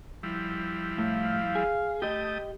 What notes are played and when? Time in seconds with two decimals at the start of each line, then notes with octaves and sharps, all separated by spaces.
0.23 F3 G3 E4
0.98 A2 F5
1.55 G#4
2.02 A3 G4 D#5 G5 D#6